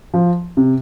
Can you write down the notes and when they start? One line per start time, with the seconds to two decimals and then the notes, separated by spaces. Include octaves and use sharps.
0.14 F3
0.57 C3